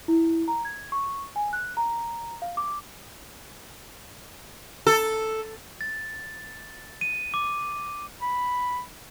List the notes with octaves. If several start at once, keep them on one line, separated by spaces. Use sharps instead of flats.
E4
A#5
G#6
C#6
G#5
F#6
A#5
F5
D6
A4
A6
D#7
D6
B5